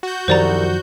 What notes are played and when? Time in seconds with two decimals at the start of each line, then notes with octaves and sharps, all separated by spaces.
0.03 F#4 G6
0.28 C2 F#2 D#3 F3 C5 D5 A#5